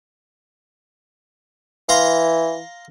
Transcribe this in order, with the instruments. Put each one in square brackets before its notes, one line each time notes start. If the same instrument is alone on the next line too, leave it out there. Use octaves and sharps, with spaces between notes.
[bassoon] E3 [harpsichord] F5 A#5 C6